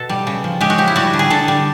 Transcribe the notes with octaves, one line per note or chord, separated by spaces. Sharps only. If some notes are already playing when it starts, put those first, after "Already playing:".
Already playing: B2 A4
G3
C#3
F3
G#3 G4
F#4
F3 G4
E4
G3 F#4
D3
G#4
D3 A4
G3